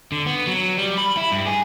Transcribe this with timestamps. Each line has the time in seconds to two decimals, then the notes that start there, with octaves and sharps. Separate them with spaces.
0.12 D3
0.26 B3
0.47 F#3
0.77 G3
0.98 B5
1.17 E4
1.32 G2
1.46 G#4